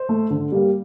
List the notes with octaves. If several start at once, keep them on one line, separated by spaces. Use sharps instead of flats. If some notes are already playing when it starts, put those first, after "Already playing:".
Already playing: C5
A3
D3
G3 A#3